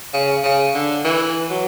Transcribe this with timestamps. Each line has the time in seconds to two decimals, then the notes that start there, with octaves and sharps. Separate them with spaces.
0.13 C#3
0.43 C#3
0.74 D3
1.04 E3
1.50 F#3